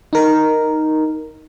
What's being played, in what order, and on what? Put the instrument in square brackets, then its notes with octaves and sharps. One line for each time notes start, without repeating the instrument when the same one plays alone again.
[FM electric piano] D#4 A#4